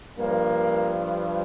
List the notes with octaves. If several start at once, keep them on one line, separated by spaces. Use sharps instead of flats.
G2 F3 A#3